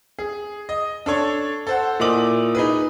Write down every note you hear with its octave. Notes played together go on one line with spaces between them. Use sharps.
G#4
D#5
D4 A4 C#5
A4 C5 F#5
A#2 E4 D#5 D6 F#7
D#4 G#4 B4